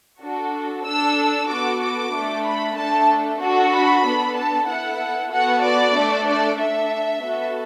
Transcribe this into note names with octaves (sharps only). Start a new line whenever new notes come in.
D4 F#4 A4
D4 A4 E6
B3 F#4 A4 D6
D6
A3 D4 A4
B5
A3 D4 A4 A5
D4 F#4 A4
B5
B3 D4 A4
A5
B3 E4 A4 F#5
B3 F#4 A4 F#5
D5
A3 D4 A4
D5
D4 A4 E5
B3 F#4 A4